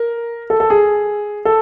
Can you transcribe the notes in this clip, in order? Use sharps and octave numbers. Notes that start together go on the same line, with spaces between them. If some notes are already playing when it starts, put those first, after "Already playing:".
Already playing: A#4
A4
A4
G#4
A4